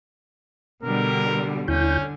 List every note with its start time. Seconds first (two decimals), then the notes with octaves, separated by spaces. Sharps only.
0.83 B2 D3 G3 A#4
1.68 D#2 D3 C#4 E4 G6